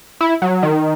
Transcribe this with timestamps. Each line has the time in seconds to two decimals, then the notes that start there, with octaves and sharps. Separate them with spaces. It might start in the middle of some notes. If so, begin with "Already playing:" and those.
0.21 E4
0.42 F#3
0.63 D#3